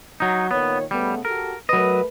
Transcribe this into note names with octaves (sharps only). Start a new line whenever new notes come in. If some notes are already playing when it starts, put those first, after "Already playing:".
F#3 D#4
A#2 D#3 B3 C#5
C#3 G3 A3 B3
F#4 G4 A4 A#4
F#3 A3 A#4 B4 D#5